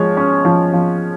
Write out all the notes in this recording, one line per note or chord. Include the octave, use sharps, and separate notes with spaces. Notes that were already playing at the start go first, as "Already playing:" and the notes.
Already playing: F3 G#3 C#5
C#4
F3
F3